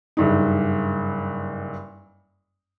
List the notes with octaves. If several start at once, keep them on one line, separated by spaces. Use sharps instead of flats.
F#1 G2 D#4